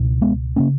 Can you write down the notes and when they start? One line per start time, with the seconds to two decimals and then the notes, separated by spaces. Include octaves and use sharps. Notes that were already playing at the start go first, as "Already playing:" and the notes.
Already playing: C#2 B2
0.22 G#3 B3
0.56 C#3 A#3 C#4